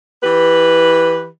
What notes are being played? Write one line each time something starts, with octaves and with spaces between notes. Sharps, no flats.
E3 G4 B4